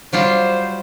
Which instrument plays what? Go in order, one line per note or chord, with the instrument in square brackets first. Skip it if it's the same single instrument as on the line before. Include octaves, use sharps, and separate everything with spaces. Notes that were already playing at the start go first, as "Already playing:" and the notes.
[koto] F#3 G3 F4 [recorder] C5